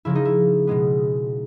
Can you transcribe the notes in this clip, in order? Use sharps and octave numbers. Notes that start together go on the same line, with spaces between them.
C#3 F3 A#3 E4
D#4
E4
B2 G#3 B3